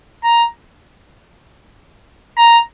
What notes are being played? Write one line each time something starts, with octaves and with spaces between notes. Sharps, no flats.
A#5
A#5